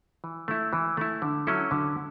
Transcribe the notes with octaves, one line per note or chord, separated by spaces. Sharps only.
E3
A3 E4
E3
A3 E4
D3
F#3 C#4 E4 A4
D3